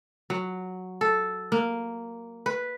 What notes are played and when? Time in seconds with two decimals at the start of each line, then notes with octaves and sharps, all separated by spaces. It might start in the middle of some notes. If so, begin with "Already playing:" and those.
0.30 F#3
1.01 A4
1.52 A#3
2.46 B4